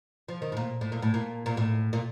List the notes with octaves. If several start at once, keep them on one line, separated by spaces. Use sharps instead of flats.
F3
D#3
A2
A#2
A2
A#2
A2
A#2
A#2
A2
A#2